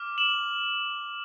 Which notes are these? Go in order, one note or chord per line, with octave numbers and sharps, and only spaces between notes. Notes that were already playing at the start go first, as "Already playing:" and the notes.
Already playing: D6 F6
E7 F#7